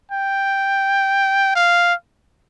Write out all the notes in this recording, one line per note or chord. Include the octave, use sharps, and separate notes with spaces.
G5
F5